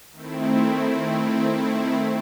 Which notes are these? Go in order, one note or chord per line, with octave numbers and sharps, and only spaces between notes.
D#3 A3 C4 E4